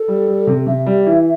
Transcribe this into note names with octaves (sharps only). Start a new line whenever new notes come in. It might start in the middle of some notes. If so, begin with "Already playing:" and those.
Already playing: A4
G3
G3
C3
C3 E5
G3
E3